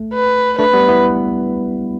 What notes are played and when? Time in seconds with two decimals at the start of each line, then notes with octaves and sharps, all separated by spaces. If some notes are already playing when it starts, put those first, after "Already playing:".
Already playing: A3
0.14 B4
0.59 A3 D4 B4
0.74 G3 B3
0.88 B3 E4